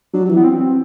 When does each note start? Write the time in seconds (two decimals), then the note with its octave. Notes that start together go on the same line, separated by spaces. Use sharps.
0.13 F#3 D4
0.25 F#3
0.29 E3
0.36 B3
0.44 C4
0.60 C4